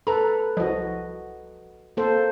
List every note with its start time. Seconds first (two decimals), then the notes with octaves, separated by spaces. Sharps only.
0.07 A4 B4 A#5
0.57 C2 F3 F#4 D#5
1.97 A#3 A4 C5